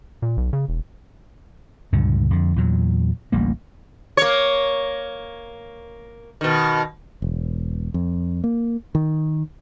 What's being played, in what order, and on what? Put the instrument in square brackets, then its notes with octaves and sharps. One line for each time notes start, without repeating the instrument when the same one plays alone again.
[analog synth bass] A#2
B1
C#3
E1
[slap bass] C#2 G2 A#2 D3
F2 D3
E2 A#2 F#3
A1 D2 G3 A#3
[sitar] A#3 C#5
B2 D#3
[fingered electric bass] E1
F2
A#3
D#3